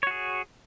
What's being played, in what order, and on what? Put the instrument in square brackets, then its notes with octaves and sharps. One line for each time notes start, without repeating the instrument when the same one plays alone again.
[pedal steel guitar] C#5
F#4
G#4